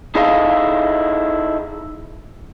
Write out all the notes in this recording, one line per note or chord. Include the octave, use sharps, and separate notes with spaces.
D#4 E4 G#4 A4 D#5 F5